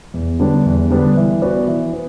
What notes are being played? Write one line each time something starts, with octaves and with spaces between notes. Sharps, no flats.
E2
D3 G3 B3 D4
E2
D3 G3 B3 D4
E3
B3 F#4 B4 D5
E3
B3